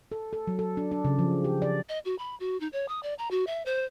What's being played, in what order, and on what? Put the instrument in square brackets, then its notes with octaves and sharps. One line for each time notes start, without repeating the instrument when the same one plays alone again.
[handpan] A4
A4
F#3
A4
D4
D4
C#3
F3
G4
D5
[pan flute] D#5
F#4
B5
F#4
D#4
C#5
D#6
D5
A#5
F#4
E5
C5